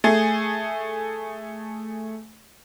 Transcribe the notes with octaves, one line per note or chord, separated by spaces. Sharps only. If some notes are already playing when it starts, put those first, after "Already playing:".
A3 G#4